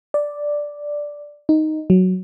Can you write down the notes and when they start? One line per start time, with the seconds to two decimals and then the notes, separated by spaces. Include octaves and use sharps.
0.14 D5
1.49 D#4
1.90 F#3